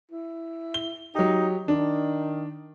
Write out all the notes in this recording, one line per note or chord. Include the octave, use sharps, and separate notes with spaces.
E4
G7
F#3 D#4 G4
D#3 D4